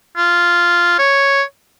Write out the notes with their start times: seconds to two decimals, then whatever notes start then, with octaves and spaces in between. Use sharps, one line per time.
0.17 F4
0.99 C#5